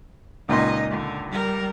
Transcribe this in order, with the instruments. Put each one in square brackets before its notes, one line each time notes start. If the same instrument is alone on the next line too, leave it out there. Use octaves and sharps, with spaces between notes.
[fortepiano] C#2 A#2 C6 [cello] D#4 D#5
[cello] D3
G3 A#4